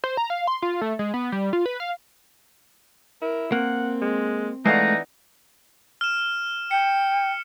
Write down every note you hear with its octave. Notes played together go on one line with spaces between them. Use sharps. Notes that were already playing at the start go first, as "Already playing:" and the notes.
C5
A#5
F5
C6
F4
A3
G#3
B3
G3
F4
B4
F5
E4 A#4
A#3 C4 F#5
G#3
E3 G#3 A3 D#4 D5 F5 F#5
F6 E7
G5 C#7